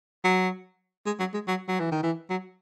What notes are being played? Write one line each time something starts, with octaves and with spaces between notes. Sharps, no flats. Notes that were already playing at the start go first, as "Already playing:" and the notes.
F#3
G#3
F#3
G#3
F#3
F#3
E3
D#3
E3
F#3